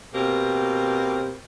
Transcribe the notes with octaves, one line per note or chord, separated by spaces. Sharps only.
B2 A#3 C4 G4